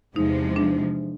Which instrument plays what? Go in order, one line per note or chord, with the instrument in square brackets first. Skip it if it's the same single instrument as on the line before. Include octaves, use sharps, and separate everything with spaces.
[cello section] E2 C3 F3 G#3 [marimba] D#4
[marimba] D4